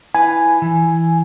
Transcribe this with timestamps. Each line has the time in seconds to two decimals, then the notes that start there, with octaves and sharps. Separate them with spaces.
0.15 E4 B4 G#5
0.62 E3